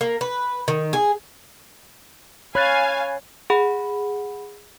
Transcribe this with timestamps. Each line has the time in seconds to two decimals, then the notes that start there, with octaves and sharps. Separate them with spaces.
0.01 A#3
0.21 B4
0.68 D#3
0.93 G#4
2.55 C#5 F5 G#5 B5 F#6 A6
3.50 G#4 F#5 B5